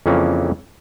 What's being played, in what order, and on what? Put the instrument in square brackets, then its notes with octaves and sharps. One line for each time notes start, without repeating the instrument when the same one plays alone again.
[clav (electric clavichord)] F2 C#3 E3 F3 A#3 C#4